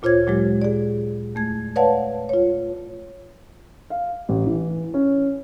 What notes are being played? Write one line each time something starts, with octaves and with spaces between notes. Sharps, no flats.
D2 A#2 F4 C5 C#5 G#6
A#2 F#3 G#3 G4
G#4 D5
E2 A3 G#6
B4 C#5 D5 F5 F#5 A5
F4 C#5
F5
A1
E3
C#4